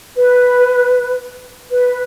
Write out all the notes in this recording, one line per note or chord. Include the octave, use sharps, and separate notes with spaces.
B4
B4